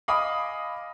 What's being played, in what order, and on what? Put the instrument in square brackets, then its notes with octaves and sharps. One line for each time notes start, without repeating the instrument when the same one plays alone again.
[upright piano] D#5 F5 G#5 B5 D6 D#6